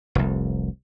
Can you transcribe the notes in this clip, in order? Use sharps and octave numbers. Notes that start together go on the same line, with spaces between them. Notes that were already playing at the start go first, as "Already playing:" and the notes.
F1 C2